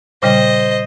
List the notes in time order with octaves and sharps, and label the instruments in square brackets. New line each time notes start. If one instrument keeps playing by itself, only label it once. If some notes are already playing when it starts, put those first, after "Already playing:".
[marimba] A#2 C#3 G3 [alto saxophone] C5 [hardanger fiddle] D#5